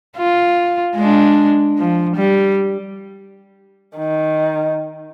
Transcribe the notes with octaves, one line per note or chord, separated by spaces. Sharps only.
F4
G#3 D4
F3
G3
D#3